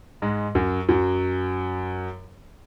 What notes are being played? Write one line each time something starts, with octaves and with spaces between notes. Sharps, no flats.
G#2 G#3
F#2 F#3
F#2 F#3